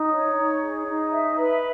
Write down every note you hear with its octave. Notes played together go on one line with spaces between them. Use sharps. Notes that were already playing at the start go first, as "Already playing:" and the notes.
Already playing: D#4
C#5
D#4
G#4
D#4
E5
B4